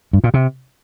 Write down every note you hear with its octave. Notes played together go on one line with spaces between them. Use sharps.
G2
A#2
C3